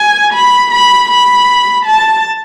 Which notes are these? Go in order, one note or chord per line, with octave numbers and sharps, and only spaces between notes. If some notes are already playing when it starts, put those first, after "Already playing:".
Already playing: G#5
B5
B5
B5
A5